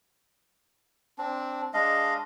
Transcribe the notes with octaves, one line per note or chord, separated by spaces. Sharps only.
C4 D4
G#3 D4 D#5 F5